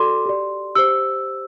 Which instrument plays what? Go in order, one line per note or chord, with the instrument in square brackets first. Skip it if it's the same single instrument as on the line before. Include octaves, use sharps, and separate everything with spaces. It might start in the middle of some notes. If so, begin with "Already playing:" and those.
Already playing: [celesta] F#4 A4 D5 C6 D6
G4 D5
G4 C5 E6